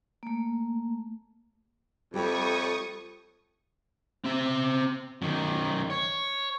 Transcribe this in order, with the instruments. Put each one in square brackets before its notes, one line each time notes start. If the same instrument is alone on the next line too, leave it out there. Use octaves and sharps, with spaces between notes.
[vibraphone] A3 A#3
[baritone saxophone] F2 [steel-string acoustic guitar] G3 A3 C#5 [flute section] G4 B5 [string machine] C#6 D#6
[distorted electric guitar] C4 E5
F#2 D#3
C#5